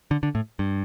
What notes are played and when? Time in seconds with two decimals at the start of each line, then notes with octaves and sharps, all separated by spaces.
0.11 D3
0.23 D3
0.35 A2
0.59 G2